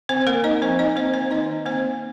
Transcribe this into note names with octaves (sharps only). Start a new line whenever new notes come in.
C4 C5
A#3 A#4
D#4 D#5
F3 C4 C5
D#4 D#5
A#3 C4 C5
C4 C5
D#3 D#4 D#5
A#3 C4 C5